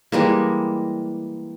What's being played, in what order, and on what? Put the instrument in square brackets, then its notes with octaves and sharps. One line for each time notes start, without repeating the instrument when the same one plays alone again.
[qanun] E3 G3 G#3 A#3